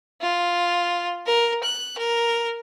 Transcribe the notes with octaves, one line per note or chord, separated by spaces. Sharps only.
F4
A#4
F#6
A#4